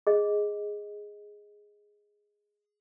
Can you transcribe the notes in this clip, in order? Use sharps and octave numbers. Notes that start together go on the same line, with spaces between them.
G#4 D#5